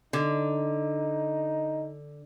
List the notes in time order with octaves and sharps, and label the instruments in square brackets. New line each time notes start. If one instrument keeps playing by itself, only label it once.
[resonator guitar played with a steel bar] D3 [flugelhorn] D#4